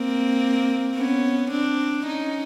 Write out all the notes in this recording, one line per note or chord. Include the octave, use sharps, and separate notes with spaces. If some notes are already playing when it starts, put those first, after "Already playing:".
Already playing: A#3 C4
B3 C#4
C4 D4
C#4 D#4